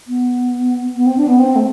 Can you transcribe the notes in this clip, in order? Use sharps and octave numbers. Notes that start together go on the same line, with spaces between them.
B3
B3
C4
D4
B3
C4
A3